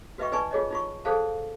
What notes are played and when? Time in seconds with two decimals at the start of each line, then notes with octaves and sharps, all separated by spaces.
0.18 F#4 B4 D#5 E5 G5 C#6
0.32 D#4 B4 D5 G#5 A5 C#6
0.51 F4 G#4 C#5 D#5
0.70 D#4 F4 C#6
1.05 G#4 A4 C5 D5 F5 A5